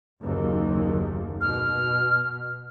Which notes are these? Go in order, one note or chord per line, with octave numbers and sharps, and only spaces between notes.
F#1 D#2
B2 F6